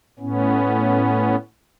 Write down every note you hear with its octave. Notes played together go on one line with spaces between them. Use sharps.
A2 B3 C#4